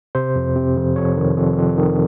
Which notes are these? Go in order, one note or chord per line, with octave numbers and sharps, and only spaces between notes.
C3 C5
F2
C3
F2
F2 C#5
D#3
F2
F2
D#3